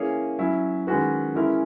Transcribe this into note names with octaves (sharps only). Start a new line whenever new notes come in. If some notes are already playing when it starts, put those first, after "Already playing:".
Already playing: E3 A#3 C#4 G#4 C#5
F#3 C#4 E4
D#3 G#3 C#4 F#4 B4
E3 G#3 C#4 E4 A#4